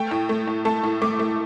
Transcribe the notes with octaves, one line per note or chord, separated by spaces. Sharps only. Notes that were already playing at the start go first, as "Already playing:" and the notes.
Already playing: A3 G5
A2
A3
A2
A3 A5
A2
A3 D6
A3